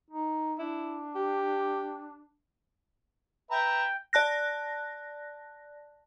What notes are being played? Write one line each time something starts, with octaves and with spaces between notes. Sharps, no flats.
D#4
D4 E4
G4
B4 E5 G5 A#5
D5 A5 F#6 A#6